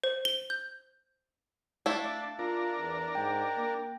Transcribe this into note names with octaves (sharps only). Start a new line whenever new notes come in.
C5
G7
G6
A3 D4 E4 F5 A5
D4 F4 A#4
E2
G#2 G5
A#3